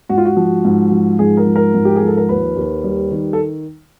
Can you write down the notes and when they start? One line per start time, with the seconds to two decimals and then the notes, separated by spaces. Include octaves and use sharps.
0.09 G#2 F#4
0.18 F4
0.25 F#4
0.37 F3
0.65 G#2
0.91 F3
1.19 G#2 G#4
1.37 A#4
1.46 F3
1.56 A#4
1.74 G#2
1.85 G4
1.96 G#4
2.01 F3
2.07 A4
2.17 A#4
2.29 D#2 B4
2.56 D#2
2.84 G3
3.11 D#3
3.33 A4